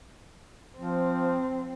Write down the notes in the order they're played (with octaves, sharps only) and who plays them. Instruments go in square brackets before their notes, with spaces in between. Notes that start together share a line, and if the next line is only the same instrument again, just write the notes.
[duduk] F3 [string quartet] C4